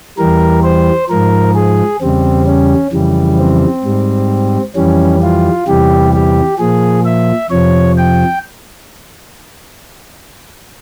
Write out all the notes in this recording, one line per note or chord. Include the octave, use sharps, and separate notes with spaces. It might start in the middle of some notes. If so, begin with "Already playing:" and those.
E2 E3 G3 A#4
C5
G#2 F3 A#4
G#4
E2 C#3 G3 C4
C#4
F2 C#3 E3 G3
C4
G#2 G3
F2 E3 G3 C#4
F4
E2 C3 E3 G3 G4
G4
A#2 F3 G#4
E5
F2 C3 F3 C#5
G5